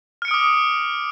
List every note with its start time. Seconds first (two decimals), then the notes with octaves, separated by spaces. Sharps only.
0.22 F6
0.25 C#7
0.28 D7
0.31 D#6
0.34 D6